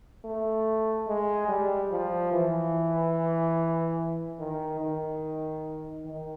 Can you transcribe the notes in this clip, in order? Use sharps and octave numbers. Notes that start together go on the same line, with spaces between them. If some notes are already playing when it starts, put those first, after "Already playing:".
A3
G#3
G3
F3
E3
D#3
D#3
D#3